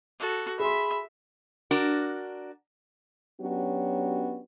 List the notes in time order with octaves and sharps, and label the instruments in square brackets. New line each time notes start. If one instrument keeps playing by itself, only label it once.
[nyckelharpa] F#4 A4
[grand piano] G#4 C6 [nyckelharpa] E5 [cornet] B5
[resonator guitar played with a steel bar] D4 F#4 A#4
[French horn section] F#3 B3 C#4 D4 F#4 G4